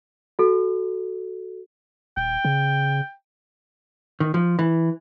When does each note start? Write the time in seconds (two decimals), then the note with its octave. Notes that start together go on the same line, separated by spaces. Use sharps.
0.39 F#4 A4
2.17 D#1 G5
2.45 C#3
4.20 D#3
4.34 F3
4.59 E3